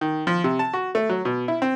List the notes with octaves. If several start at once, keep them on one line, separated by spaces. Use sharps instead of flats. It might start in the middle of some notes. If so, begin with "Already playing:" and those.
D#3
F3
C3
A5
F#4
A3
F#3
B2
E4
C4